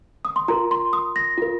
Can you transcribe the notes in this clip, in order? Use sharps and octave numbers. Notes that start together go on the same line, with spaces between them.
D#6
C6
F4 A#4 A#5
C6
D#6
A#6
F4 A#4